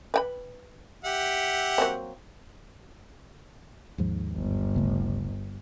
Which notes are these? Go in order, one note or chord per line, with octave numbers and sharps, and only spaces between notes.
B4 G5 B5
G4 E5 F#5
F#3 A#3 C4
D#2 G#2 F3
G1
D1 C#3 A3